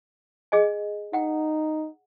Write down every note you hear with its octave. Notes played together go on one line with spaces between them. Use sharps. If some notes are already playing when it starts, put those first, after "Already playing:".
G#4 D#5 G#5
D#4 F#5 G5